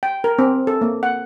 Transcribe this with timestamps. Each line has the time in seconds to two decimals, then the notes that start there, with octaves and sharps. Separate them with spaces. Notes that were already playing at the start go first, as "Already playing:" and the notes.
0.03 G5
0.24 A#4
0.39 C4
0.67 A4
0.81 A#3
1.03 F#5